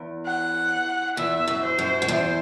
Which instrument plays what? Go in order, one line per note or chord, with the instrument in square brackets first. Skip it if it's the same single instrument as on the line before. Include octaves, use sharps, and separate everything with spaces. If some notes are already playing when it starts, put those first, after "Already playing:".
Already playing: [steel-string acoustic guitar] E2
[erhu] F#5
[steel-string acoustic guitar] E2 [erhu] E5
[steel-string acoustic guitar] F#2
[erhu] C5
[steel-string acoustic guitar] F#2
F#2
[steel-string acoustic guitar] E2 [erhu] C5